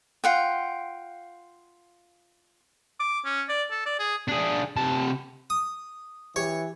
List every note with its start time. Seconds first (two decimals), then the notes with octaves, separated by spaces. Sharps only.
0.24 F4 F#5 G5
3.00 D6
3.25 C#4
3.49 D5
3.71 A4
3.86 D5
3.99 G#4
4.28 D4 G#4
4.77 C3 A5
5.50 D#6
6.36 E3 G4 C#5